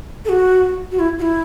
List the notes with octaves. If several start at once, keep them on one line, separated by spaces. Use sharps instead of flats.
A4
F#4
F#4
E4
F#4
E4